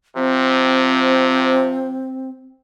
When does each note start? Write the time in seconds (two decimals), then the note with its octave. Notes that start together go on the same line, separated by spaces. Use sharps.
0.16 C3 F3 C4